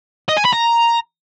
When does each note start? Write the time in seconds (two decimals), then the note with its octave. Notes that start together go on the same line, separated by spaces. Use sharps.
0.29 D#5
0.37 G#5
0.45 B5
0.53 A#5